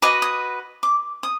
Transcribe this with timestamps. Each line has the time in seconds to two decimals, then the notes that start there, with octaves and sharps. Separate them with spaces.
0.02 F#4 B4 D#5 D6
0.22 D#6
0.83 D6
1.23 D#6